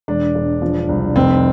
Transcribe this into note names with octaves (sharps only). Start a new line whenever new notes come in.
E1 D4
E1
F3
C2
F1 C4